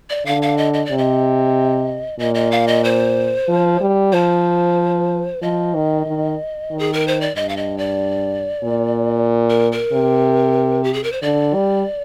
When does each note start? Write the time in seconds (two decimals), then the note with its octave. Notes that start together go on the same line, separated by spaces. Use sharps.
0.10 D5
0.26 D3 F5
0.42 F5
0.57 D#5
0.74 D#5
0.86 D5
0.91 C3
0.98 D#5
2.19 A#2 D#5
2.35 D#5
2.51 F5
2.68 D#5
2.84 C5
3.48 F3
3.81 G3
4.12 F3 C5
5.42 F3 D#5
5.74 D#3
6.06 D#3
6.71 D#3
6.79 G#4
6.93 A#4
7.08 C5
7.21 D5
7.35 G2 D#5
7.49 F5
7.57 D#5
7.78 D5
8.64 A#2
9.50 A#4
9.72 A#4
9.93 C3
10.84 G4
10.94 G#4
11.04 A#4
11.12 C5
11.22 D3 D5
11.54 G3